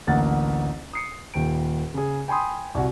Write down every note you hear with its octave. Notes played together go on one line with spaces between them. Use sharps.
A1 D2 A#3 F#5 A6
D#6 C7 C#7
D#1 D#2 G5 D7
C#3 G#4
G5 G#5 B5 C6 D#6
C2 F#4